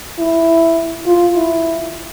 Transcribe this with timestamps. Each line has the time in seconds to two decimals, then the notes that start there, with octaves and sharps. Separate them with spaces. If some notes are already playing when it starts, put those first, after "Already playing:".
0.19 E4
1.06 F4
1.36 E4